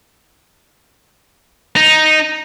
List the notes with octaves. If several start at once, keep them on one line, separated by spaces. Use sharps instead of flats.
D#4